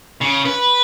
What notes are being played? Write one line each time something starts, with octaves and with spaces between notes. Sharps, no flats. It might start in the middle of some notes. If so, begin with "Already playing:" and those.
C#3
B4